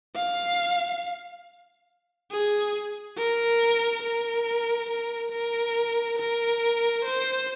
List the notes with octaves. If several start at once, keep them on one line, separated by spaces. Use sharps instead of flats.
F5
G#4
A#4
A#4
A#4
A#4
A#4
C5